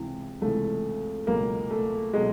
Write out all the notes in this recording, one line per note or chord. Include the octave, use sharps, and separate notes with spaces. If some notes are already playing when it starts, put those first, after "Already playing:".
Already playing: C#2 C3 E3
C#2 C3 E3 A3
C#2 B2 F#3 A#3
A3
B2 F#3 G#3